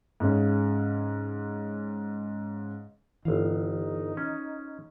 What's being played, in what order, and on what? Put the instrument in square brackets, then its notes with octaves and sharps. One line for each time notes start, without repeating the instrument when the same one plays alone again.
[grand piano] G#2 C#3 C#4
[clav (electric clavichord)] G1 F5 [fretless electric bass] E3 [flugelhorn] D#4
[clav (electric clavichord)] C#4